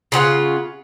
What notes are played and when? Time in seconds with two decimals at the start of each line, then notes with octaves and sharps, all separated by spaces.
0.12 C#3 F4 G#4 F#5